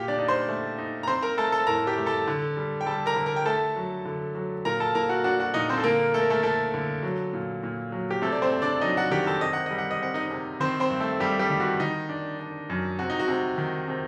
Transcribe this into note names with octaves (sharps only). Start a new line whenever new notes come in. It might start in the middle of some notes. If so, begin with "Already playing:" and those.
Already playing: A#2 G4 G5
D4 D5
D#4
C5 C6
A3
D#4
A#5
C4 C5 C6
A#4 A#5
A3 A4 A5
A4 A5
A2 A#4 A#5
G4 G5
A3
A4 A5
D3
G3
G5
G3 A4 A5
A#4 A#5
D3
A#4 A#5
G5
A3 A4 A5
F#3
D3
F#3
A#2 A#4 A#5
A4 A5
A#2 A#4 A#5
F#4 F#5
D4 F#4 F#5
F#4 F#5
A#2 D#4 D#5
C4 C5
A4
D3 A#3 A#4
A3 A4
A#4
A3 A4
A3 A4
D3
F#3
A#2
A#2
F#3
G4
C3 A3 A4
D5
C4 C5
C3
D4 D5
F#3 D#4 D#5
F#4 F#5
D#3 G4 G5
A4 A5
C3 D#5
F#5
G3 D#5
F#5
D#5
C4 F#5
D#4 D#5
C3
D#3 C4 C5
C4 C5
G2
A3 A4
G2 G3 G4
G3 G4
D#3
F#4
D#3 D#4
D4
D4
F#2
C3 F#4
D#4
F#4
C3
D#3
C3